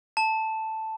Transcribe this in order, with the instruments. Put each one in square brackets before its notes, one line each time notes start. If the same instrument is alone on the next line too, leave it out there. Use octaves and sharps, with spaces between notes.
[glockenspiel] A5